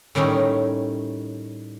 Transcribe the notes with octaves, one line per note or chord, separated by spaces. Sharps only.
A2 D#3 G3 C#4 D#4